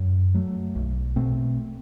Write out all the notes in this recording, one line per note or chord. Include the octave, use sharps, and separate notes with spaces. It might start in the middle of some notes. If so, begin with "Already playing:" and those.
Already playing: F#2
F#3 A3
B1
B2 A3 C4